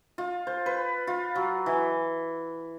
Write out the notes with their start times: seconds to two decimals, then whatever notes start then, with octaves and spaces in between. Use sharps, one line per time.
0.18 F4
0.47 C5
0.66 B4
1.07 F4
1.35 F#3
1.66 E3